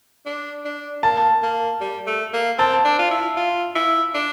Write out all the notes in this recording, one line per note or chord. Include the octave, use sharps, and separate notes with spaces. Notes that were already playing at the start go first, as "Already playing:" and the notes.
D4
D4
A#3 A5
A#3
G3
A3
A#3
C4 A5
D4
F4
E4
F4
E4
D4